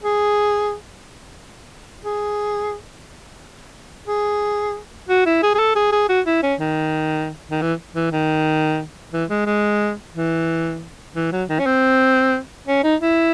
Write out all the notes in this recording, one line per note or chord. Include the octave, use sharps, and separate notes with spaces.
G#4
G#4
G#4
F#4
E4
G#4
G#4
A4
G#4
G#4
F#4
E4
C#4
D#3
D#3
E3
E3
D#3
E3
G#3
G#3
E3
E3
F#3
D#3
C#4
C4
C#4
D#4
E4